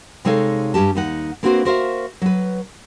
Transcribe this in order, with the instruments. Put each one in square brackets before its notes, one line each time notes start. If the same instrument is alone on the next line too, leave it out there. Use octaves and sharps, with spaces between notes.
[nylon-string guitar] C3 G#3 D#4 A4 C#5 F5
G2 C#4 G4 A5
D#2 D#4 F#5
A#3 C4 D4 F#4 B4 C5
F#4 A#4 C5 E5 F5
F#3 B4